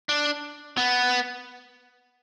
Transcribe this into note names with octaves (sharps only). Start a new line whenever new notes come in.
D4
B3